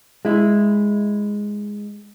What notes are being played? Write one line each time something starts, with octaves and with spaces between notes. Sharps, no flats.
G#3 E4